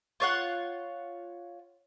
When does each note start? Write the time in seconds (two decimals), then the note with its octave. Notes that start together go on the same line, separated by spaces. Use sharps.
0.20 F4 C#5 F#5